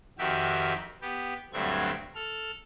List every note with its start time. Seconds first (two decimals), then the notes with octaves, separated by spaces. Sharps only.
0.19 F2 D#3 F#4 G4 E5
1.02 B3 G4
1.53 D2 G2 F#3 A3 C4 G#6
2.15 A4 F6